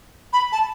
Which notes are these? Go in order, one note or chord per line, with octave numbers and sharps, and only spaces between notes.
B5
A5